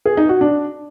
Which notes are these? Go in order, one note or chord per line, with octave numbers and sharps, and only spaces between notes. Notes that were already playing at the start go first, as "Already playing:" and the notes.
G#4
D#4
F#4
D4